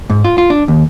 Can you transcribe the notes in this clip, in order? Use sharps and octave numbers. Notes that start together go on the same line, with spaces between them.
G#2
F4
F4
D4
D#2